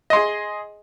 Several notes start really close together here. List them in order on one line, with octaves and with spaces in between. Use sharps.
D#5 C6 G#4